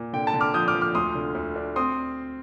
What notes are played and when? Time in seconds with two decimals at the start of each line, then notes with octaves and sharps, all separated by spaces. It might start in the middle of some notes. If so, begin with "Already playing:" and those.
Already playing: A#2
0.13 D3 G5
0.27 A5
0.34 D3
0.41 D6 F6
0.54 F3 D#6 G6
0.68 D6 F6
0.75 F3
0.81 D6 F6
0.95 D2 C6 D#6
1.15 D3
1.35 D2
1.56 D4
1.76 C4 C6 D#6